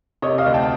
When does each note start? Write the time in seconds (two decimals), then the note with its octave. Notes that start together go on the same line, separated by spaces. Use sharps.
0.22 C3 C#5 D#5
0.38 D#5 F5
0.46 D2
0.54 G5 A5